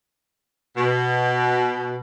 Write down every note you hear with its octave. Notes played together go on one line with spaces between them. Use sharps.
B2